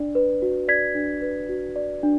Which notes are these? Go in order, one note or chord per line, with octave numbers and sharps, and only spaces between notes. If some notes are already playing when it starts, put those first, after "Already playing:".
Already playing: D4 D5
B4
F#4
D5 G#6 B6
D4
B4
F#4
D5
D4